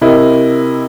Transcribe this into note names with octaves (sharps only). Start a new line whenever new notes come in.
C3 E4 A#4 D#5